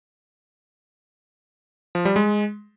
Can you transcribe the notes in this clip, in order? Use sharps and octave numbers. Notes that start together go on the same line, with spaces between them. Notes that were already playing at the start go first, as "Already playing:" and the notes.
F3
G3
G#3